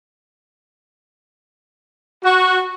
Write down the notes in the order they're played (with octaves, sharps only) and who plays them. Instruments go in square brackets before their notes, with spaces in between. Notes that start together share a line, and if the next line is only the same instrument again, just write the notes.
[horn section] F#4